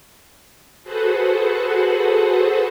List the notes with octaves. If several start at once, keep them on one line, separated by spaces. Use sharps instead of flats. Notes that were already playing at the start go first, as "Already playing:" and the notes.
F#4 G#4 A4 B4 C5 F#5